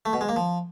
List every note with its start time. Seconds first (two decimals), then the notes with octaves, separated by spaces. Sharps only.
0.06 A3
0.13 B2
0.21 G#3
0.29 A#3
0.36 F3